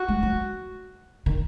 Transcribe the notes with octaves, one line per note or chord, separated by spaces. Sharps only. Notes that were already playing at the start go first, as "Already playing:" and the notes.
Already playing: F#4
G#3
F#3
D#3